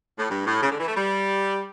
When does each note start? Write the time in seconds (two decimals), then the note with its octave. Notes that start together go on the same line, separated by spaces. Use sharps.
0.18 A2
0.29 G2
0.46 A2
0.62 C#3
0.71 D3
0.79 E3
0.87 A3
0.96 G3